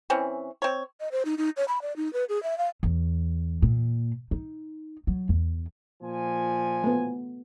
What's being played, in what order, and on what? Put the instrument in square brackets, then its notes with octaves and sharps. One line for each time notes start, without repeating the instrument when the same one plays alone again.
[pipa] E3 C4 C#4
C4 C#5
[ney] D#5
C5
D#4
D#4
C#5
B5
D5
D#4
B4
G#4
E5
F5
[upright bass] E2
A#2
D#4
F#3
E2
[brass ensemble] A#2 F3 G#5
[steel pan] A3 B3